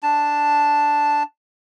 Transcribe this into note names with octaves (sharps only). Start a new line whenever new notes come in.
D4 A5